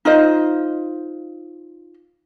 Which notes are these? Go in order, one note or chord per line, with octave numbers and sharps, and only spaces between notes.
D#4 F4 C5 D#5